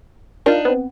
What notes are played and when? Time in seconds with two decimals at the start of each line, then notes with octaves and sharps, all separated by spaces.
0.46 D4 D#4 F4 A#4
0.65 B3 C4